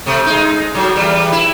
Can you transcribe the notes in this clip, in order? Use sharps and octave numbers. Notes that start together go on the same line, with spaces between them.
C3 A3
G#3 D#4
A2 F#3
E2 G3
E4